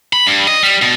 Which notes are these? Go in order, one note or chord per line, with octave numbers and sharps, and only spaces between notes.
B5
G2
D#5
G3
B2